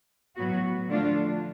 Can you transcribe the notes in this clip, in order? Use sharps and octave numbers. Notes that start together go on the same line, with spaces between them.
A2 F#3 B3 F#4
D3 F3 A3 D4 F4